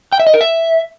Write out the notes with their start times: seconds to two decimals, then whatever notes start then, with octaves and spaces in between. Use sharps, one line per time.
0.12 G5
0.20 E5
0.27 D#5
0.34 A#4
0.41 E5